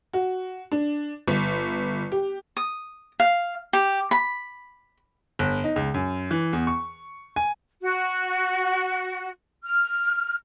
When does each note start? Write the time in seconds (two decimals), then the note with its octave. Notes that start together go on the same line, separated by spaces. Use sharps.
0.13 F#4
0.72 D4
1.28 G1
2.12 G4
2.57 D#6
3.20 F5
3.73 G4
4.11 B5
5.39 G1
5.64 D#4
5.76 C#2
5.94 F#2
6.31 E3
6.53 E2
6.67 C#6
7.36 G#5
7.82 F#4
9.64 F6